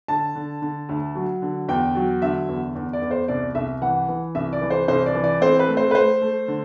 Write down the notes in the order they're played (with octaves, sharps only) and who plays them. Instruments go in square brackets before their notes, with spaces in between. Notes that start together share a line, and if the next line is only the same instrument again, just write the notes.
[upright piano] D3 A5
D3
D3
D2
F#3
D3
E2 G5
F#3
D3 E5
E2
E2
D5
E2
C5
C2 D5
C2 E5
E3 F#5
E3
C2 E5
D5
E3
C5
C2 C5
D5
E3
D5
C4 C5
B4
A3
C5
B4
A3 C5
A3
D3